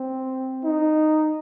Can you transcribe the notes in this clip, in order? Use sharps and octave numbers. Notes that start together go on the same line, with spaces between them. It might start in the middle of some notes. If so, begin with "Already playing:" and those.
Already playing: C4
D#4